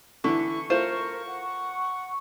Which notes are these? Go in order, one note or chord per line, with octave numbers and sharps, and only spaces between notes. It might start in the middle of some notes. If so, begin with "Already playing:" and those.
D3 E3 E4 C#6
A3 F4 A#4 C5
F#5